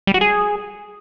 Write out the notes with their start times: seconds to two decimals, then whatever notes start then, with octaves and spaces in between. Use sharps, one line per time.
0.07 G3
0.14 F#4
0.21 G#4